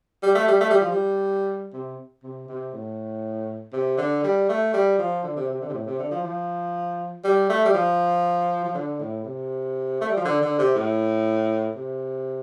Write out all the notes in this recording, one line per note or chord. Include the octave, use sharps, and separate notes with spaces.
G3
A3
G3
A3
G3
F3
G3
C3
C3
C3
A2
C3
D3
G3
A3
G3
F3
D3
C3
C3
D3
C3
A2
C3
D3
F3
F3
G3
A3
G3
F3
F3
D3
A2
C3
A3
G3
F3
D3
D3
C3
A2
C3